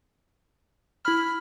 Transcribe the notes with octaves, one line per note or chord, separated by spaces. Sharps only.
E4 B5 F6